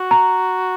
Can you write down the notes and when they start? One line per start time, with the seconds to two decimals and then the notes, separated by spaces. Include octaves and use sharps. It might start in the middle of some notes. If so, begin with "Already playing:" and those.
Already playing: F#4
0.11 A#5